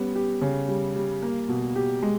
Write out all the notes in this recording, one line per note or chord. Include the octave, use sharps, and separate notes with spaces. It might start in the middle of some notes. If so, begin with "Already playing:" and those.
Already playing: G3 B3 C#4
G4
C#3
G3
G3
A#3
B2
G4
G#3